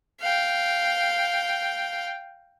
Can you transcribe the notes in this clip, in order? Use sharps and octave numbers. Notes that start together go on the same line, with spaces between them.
F5 G5